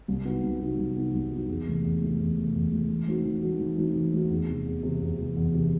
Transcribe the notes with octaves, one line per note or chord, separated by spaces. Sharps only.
C2
C3 F#3 B3 D#4
C2
C3 F#3 B3 D#4
C2
C3 F#3 B3 D#4
C2
C3 F#3 B3 D#4
E2
C3 E3 A3
E2
C3 E3 A3
E2
C3 E3 A3
E2
C3 E3 A3
E3
A3 C4 D#4 F#4
E3
A3 C4 D#4 F#4
E3
A3 C4 D#4 F#4
E3
A3 C4 D#4 F#4
E2
C3 E3
E2
C3 E3
E2
C3 E3
E2
C3 E3